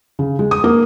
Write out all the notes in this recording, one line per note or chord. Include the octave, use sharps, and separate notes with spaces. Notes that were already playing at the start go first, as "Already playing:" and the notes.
C#3
G#3
D#6
A#3